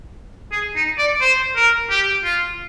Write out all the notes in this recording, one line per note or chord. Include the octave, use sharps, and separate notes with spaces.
G#4
D#4
D5
C5
A#4
G4
F4